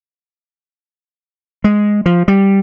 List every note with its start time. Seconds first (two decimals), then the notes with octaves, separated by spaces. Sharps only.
1.64 G#3
2.06 F3
2.28 G3